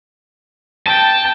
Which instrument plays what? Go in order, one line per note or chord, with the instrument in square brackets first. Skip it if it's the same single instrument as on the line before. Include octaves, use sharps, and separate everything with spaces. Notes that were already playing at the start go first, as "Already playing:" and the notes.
[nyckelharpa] G5 [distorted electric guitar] A5